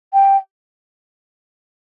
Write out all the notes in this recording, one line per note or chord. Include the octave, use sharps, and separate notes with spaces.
G5